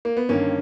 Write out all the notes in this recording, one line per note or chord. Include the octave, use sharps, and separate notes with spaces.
A#3
B3
G1 G2 D#3 A#3 C#4